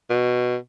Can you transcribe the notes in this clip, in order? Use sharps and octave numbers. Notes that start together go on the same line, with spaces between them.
B2